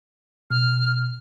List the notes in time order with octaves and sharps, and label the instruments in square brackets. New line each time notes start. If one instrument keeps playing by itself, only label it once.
[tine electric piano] B2 [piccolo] F6